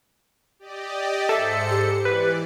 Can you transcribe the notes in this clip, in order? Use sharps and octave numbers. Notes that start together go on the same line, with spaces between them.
G4 D5 D#5
G#2 A4 C5 E5 C#7
G4
E3 B4 D5